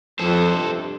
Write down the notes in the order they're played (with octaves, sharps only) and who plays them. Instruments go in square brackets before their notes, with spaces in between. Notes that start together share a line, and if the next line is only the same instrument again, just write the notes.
[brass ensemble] F2 [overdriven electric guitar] A4 C5
[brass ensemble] G2 C3